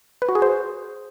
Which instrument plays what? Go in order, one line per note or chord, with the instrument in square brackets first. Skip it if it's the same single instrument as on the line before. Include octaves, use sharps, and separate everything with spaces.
[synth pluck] B4
F#4
G#4
C5